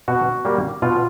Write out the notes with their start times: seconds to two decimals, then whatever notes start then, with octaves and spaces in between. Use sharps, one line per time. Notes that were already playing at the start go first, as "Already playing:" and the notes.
0.08 B2 F#4
0.45 G3 A#3
0.82 B2 F4